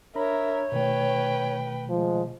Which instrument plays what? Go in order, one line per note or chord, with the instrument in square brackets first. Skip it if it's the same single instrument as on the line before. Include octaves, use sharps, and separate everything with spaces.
[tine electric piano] D4 A#5 B5 [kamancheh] A#4 E5 [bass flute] C#5
[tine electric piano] B2 D#3 A3 [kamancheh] B4 G5
[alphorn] F3 [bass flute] G#3